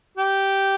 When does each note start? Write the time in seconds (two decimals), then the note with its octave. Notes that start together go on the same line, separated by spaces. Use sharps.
0.18 G4